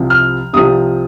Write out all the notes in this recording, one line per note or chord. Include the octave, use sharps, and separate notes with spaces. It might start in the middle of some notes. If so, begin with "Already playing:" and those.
Already playing: C2 C3 F3
F6
C2 C3 F3 D#6